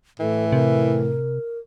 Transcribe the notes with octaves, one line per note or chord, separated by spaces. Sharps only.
A2 E3 A4
C3 A#4